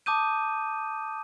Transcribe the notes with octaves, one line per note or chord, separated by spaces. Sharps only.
A5 D6 D#6 G6 D#7